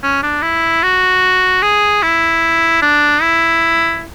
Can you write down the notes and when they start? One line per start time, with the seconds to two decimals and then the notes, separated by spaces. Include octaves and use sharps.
0.03 C#4
0.23 D4
0.43 E4
0.83 F#4
1.62 G#4
2.03 E4
2.82 D4
3.22 E4